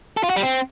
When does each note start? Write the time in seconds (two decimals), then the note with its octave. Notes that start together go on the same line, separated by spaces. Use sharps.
0.17 A4
0.23 F4
0.30 F#4
0.36 G3
0.43 C4